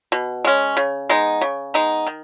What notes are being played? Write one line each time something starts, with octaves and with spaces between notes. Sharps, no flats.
B2
G#3 C#4
C#3
G#3 B3 D#4
C#3
G#3 B3 D#4
D#3